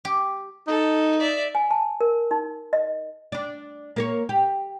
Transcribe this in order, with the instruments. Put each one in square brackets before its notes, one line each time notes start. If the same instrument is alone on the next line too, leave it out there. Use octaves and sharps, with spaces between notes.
[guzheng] G4
[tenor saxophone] D#4 [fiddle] A4
[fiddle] D5 E5
[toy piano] G#5
A5
A#4
D#4
D#5
[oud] D4 D5
A#3 A#4 C#5
G4